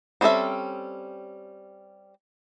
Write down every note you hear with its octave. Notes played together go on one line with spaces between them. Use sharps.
G3 C4 C#4 A4 E5